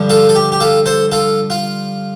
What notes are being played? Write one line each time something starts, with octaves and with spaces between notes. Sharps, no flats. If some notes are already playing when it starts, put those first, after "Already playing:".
Already playing: G2 D3 F3
F4 A4
A4
G4
G4
F4 A4
A4 C5
F4 A4
F4